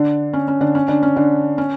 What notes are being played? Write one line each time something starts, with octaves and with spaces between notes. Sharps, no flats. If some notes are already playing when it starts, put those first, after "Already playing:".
Already playing: D3 D4
C#4
C#4
D3 D4
C#4
D3 D4
C#4
D3 D4
C#4